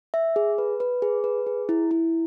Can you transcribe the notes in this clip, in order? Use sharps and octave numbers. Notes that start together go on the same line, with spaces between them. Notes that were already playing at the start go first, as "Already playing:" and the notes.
E5
G#4
B4
B4
G#4
B4
G#4
E4
E4